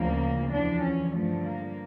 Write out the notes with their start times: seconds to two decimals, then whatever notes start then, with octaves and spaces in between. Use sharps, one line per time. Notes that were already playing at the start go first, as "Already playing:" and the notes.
Already playing: D2 C#3 F3 A#3
0.50 E2 D3 F3 D4
0.81 C#4
1.13 G2 D3 F3 A3
1.45 A#3